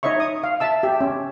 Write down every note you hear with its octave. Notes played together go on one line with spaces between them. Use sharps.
D#4 C#5 D#5 E5 C#6
D#6
F5
E5 A5 E6
G4 E5
C#4